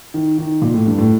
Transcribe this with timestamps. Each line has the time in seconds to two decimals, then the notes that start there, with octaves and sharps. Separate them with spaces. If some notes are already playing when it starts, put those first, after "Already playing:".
0.14 D#3
0.38 D#3
0.62 A#2
0.74 A2
0.87 G2
0.98 A2